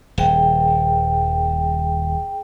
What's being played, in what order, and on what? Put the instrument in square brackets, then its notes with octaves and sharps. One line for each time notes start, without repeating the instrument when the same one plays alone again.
[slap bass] D#1 [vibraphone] G#4 G5